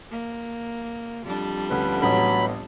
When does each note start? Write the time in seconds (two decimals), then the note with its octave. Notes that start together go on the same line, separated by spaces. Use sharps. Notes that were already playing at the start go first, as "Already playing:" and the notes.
0.11 A#3
1.24 F2 G3 D4
1.70 D2 C#4 B4
2.02 A1 A2 F#3 B3 B5